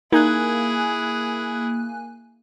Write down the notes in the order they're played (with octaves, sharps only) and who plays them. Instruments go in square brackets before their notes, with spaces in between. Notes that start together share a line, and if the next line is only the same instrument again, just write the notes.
[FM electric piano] A#3 G#5 F#6 [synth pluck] D#4 [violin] E4 G#4